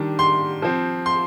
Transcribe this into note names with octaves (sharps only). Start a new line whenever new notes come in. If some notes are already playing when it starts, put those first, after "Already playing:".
Already playing: D#3 G3 D4
C6
F3 C4
C6